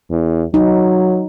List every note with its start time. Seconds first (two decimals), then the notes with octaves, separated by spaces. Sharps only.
0.10 E2
0.54 F#3 D#4